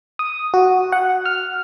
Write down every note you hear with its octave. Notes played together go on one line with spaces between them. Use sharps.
D#6
F#4
F#5
F6